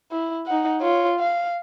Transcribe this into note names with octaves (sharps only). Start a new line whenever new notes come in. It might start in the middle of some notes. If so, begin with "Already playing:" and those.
E4
D#4 F#5
F4 C#5
F5